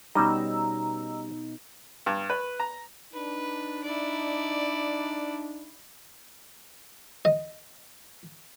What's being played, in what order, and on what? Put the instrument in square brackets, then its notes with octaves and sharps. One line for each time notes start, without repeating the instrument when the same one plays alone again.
[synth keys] B2 D#4 [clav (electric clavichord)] G3 C#4 [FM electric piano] A#5 E6
[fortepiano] G2
B4
A#5
[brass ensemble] D4 D#4 [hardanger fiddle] B4
[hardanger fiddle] E4 D5
[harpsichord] D#5